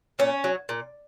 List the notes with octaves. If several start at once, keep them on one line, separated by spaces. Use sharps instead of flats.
A#2 C#4
F#3
A#2